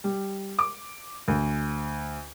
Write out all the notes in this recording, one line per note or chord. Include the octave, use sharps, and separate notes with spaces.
G3
D6
D2